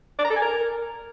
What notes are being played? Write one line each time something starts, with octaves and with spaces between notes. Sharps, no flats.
D5
A#5
A4
G#5
A#4